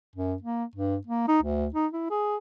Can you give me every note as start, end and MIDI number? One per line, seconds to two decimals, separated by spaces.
0.16 0.34 42
0.42 0.64 58
0.76 0.96 43
1.07 1.27 58
1.28 1.40 63
1.43 1.67 38
1.74 1.87 63
1.93 2.07 64
2.10 2.36 68